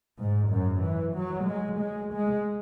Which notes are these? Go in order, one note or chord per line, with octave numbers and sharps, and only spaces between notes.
G#2
F#2
E3
F#3
G#3
G#3
G#3